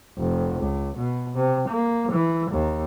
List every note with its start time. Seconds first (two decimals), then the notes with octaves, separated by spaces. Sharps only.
0.17 F1
0.59 C#2
0.97 B2
1.35 C3
1.69 A#3
2.11 E3
2.51 D#2